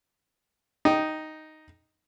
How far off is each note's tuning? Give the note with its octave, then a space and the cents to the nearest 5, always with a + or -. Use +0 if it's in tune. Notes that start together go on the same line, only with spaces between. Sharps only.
D#4 +0 G5 -10